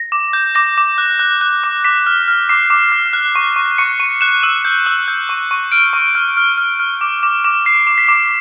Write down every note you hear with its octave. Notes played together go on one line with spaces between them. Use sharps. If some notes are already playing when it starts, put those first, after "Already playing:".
Already playing: A#6
D6
G6
D6 A#6
D6
F#6
F#6
F#6
D6
D6 B6
F6
F6
D6 C7
D6
F6
F#6
C#6
C#6
C#6 C#7
C#6 D#7
F#6 E7
E6 D#7
G6
E6
G6
C#6
C#6
F6 D7
C#6
F6
F6
F6
F6
D6
D6
D6
D6 C7
D6
B6
D6